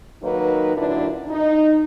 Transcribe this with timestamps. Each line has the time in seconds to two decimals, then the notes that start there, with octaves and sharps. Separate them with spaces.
0.22 D#3 F#3 A#3 D#4 B4
0.76 F#2 A#2 D3 D4 E4
1.28 D#4